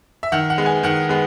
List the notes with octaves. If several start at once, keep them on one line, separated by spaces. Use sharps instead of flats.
E5
D#3 F#5
F#5
G#3 B3
G#5
D#3 F#5
G#3 B3